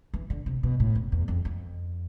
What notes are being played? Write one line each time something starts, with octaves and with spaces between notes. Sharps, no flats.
E3
D3
C3
B2
A2
F2
E2
F2
F2